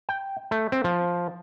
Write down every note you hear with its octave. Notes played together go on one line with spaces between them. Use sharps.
G5
A3
C4
F3